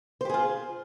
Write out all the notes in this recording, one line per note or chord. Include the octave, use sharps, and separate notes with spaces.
F4 G4 G#4 C5